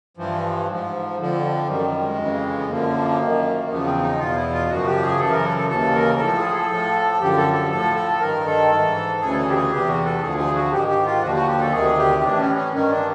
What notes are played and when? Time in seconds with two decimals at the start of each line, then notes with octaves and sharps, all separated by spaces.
0.17 G2 E3 F3
0.68 G#2 F3
1.18 F2 D3 F3
1.67 F#2 D#3 G3
2.01 G#3
2.18 F2 C#3 E3
2.57 B3
2.68 F#2 D3 F3 A#3
3.18 F#2 D#3
3.69 E2 C#3 F3 B3
3.85 C4
4.02 D#4
4.19 E2 B2 F4
4.36 E4
4.53 F4
4.69 F#2 C#3 F3 F#4
4.86 G4
5.03 G#4
5.19 F#2 C#3 E3 A4
5.32 A#4
5.44 A4
5.58 A4
5.69 D#2 C#3 E3 A4
5.94 A#4
6.19 A2 F3 A4
6.37 G#4
6.53 A4
6.70 A2 F3
7.20 F#2 D3 F3 G4
7.37 A4
7.53 A4
7.70 A2 F3 A4
7.96 A4
8.20 G2 D#3 A#4
8.46 A4
8.71 G#2 E3
9.21 D2 C#3 E3 G#4
9.31 A4
9.38 G#4
9.50 G4
9.55 G#4
9.71 E2 C3 E3 G4
9.88 F#4
10.05 A4
10.21 D2 D3 F3 G#4
10.38 G#4
10.55 F#4
10.71 G#2 D#3 G4
10.88 G4
11.05 F4
11.21 D#2 D3 F3 F#4
11.34 F#4
11.47 G4
11.60 A4
11.72 D2 C3 D#3 G#4
11.97 G4
12.22 A2 E3 D4
12.39 C#4
12.56 C#4
12.72 G2 D#3 C#4
12.90 D4